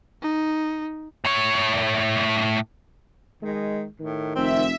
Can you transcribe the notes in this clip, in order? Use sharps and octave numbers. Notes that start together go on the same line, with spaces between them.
D#4
A2 C#5
D#3 G#3
A2 D#3
F1 C4 E5